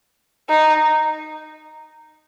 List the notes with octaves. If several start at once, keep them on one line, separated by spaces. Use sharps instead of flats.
D#4